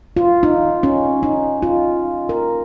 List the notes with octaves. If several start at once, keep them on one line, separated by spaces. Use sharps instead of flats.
F4
D#4
C#4
D#4
F4
A#4